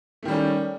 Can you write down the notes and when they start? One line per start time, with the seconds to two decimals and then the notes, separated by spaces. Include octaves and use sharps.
0.23 A3
0.25 D#3
0.28 G3
0.31 C#4